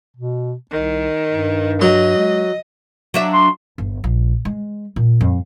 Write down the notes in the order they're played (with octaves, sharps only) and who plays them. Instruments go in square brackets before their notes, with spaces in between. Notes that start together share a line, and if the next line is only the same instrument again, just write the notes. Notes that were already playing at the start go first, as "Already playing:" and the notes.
[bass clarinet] B2
[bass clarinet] C2 [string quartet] D#3
[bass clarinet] G2
[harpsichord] F#3 [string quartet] D#5
[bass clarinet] G#3
[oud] F#3 D4 E5
[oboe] C6
[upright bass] G1
A#1
G#3
A#2
F2